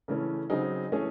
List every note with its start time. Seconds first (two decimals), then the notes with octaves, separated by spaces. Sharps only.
0.08 C#3 E3 A3 C#4
0.50 C#3 F#3 C4 D#4 G#4
0.92 E3 A3 C#4 G#4